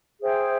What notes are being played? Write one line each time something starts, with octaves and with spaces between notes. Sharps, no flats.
G#4 C5 E5 G5